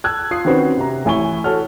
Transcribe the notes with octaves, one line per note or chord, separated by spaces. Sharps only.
A5 E6 F#6 G#6
F4 D#6 C7
D#3 C4 C#4 F#4 B4 C5
C3 A#5
A1 E4 G#5 C#6 G7
F#4 A4 C#5 F#5 F6